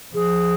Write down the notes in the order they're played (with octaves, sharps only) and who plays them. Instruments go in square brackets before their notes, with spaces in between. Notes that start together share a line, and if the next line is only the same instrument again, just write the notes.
[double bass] F3 [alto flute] G#4